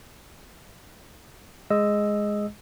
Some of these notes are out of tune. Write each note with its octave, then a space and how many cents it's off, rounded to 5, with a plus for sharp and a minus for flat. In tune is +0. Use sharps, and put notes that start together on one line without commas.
G#3 +0 D#5 +0 E6 +0